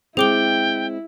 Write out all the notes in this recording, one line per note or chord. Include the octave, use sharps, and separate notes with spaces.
G#3 C4 E4 G#4 G5 D6 G7